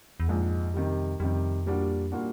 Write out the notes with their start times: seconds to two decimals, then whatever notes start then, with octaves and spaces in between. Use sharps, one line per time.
0.20 E2
0.28 A#1 F2 G#2 F3 G#3
0.74 C3 D#3 G3
1.20 F2 C3 D#3 G3
1.66 A#2 G3 A#3 D4 F#4
2.12 A#2 G3 A#3 D4 F#4